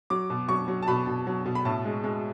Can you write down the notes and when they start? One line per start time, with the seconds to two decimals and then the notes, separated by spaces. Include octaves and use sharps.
0.10 F#3 D6
0.30 B2
0.49 F#3 C#6
0.68 F#3
0.82 A5
0.88 B2 B5
1.07 B2
1.27 F#3
1.46 B2
1.55 B5
1.65 A2 A5
1.85 G#3
2.04 G#3